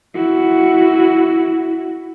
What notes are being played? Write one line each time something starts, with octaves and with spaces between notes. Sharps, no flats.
E4 F#4